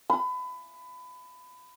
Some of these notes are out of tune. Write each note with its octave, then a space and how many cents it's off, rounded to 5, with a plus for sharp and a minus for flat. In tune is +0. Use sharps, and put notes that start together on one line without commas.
B5 +25